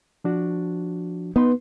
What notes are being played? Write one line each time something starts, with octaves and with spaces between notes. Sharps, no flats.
F3 D4 F#4
B3 D#4 B4 C6